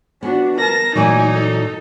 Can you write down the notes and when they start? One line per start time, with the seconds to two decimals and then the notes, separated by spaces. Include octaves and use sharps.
0.23 B3 D4 F#4
0.59 A#4 A5 A#6
0.95 A#2 E3 F#3 A3 D#4 G#5
1.33 A4